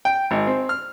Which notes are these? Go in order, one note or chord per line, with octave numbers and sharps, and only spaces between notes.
G5
G#1
C4
F6